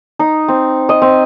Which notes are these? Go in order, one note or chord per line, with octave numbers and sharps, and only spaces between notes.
D#4
C4
D#5
C4